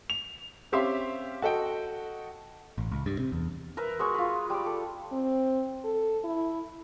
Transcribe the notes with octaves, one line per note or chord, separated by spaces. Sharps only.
F7
C4 C#4 G4 E5 F5 C6
F#4 A4 D#5 G5
A1
C#2
G2
C3
E2
A#4 B4 E5
G#3 F#4 E5 C#6
F4 B4
G3 D6
A4
C4
A4
E4